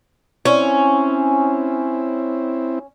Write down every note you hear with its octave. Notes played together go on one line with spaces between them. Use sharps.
C4 C#4 E4